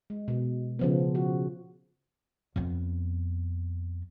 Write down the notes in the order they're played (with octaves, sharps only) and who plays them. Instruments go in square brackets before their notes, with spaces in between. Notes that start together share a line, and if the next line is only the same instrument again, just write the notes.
[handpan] G#3
B2
C#3 F3 B3
F#4
[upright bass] F2 B3